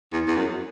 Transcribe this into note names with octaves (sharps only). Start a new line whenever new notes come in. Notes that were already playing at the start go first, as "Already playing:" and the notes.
E2
E2
F#2